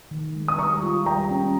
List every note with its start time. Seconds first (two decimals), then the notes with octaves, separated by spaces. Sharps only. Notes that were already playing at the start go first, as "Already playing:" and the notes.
0.11 D#3
0.35 G#3
0.48 D#6
0.58 G3 A#5 C#6
0.83 F4
1.06 G3 G5 A#5
1.31 C#4